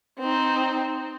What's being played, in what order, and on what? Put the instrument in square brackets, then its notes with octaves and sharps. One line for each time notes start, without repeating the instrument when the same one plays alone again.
[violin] C4 D#4